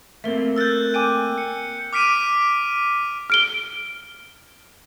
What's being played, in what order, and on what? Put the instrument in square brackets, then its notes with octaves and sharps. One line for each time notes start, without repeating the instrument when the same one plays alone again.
[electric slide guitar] A3 A#3 C4 [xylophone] A#4 E5
[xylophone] A#4 A6 [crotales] E6 F#6 G6
[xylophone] G5 G#5 D6 [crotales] D#7
[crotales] C#7
D6 F6 B6 D7 D#7
[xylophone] F6 D7 G7